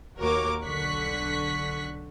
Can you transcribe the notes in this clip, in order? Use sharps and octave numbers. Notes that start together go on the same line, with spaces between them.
D#2 A#3 F#4 A#4 C#5 D6
B1 D3 C#6 F#6 B6